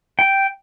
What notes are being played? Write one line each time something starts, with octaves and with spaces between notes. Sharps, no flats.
G5